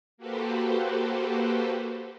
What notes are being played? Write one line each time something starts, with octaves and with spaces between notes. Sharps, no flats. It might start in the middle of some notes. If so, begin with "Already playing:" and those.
A#3 F#4 G4 A4 B4 C5